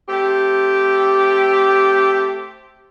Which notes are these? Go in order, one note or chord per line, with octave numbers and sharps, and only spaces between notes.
A3 C4 G4